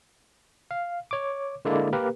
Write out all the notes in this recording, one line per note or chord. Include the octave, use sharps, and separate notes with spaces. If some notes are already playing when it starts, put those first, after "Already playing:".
F5
C#5 D6
D3 G#3 A#3 E4 A4 D5
A#3 G4 A#4 B4